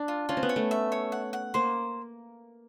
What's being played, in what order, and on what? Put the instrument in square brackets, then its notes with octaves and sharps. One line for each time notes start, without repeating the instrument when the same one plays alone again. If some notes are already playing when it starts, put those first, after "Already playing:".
Already playing: [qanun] D4
[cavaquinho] F4
[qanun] C#4 [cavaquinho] F4
[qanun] C4
B3
[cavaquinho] C#5
[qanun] A3
[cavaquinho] E5
C#5
F#5
F#5
[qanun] A#3 [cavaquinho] C5